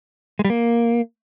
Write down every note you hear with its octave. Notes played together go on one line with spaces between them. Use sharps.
G#3
G3
A#3